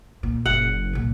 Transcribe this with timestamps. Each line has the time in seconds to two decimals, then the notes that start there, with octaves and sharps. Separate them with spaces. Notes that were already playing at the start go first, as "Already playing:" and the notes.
0.23 A#2
0.46 F#1 F#5
0.93 C2 A#2